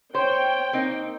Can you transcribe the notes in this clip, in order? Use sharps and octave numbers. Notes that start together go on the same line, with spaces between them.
C5 C#5 G5
A#3 C4 D#4